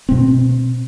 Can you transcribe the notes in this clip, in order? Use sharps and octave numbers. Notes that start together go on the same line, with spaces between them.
B2 C4